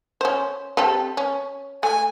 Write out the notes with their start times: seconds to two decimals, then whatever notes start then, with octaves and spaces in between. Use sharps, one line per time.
0.21 C#4 C5
0.77 C4 G4 A4
1.17 C#4
1.83 A3 G#5